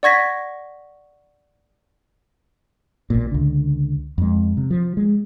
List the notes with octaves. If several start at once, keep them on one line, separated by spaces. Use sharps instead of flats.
D5 F#5 C#6 G#6 A#6 B6
A1 A#2
C#2 D3
F2 G#3
C3
F3
G#3